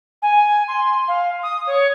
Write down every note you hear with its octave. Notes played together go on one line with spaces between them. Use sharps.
G#5
C6
F5
D#6
C#5